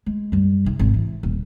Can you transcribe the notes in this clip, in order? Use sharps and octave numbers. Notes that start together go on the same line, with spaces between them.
G#3
F#2 G3
C3 D#4
G#1
E3
D#1